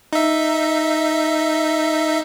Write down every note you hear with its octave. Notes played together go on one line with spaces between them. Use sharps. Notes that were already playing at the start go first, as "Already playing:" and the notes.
D#4 E5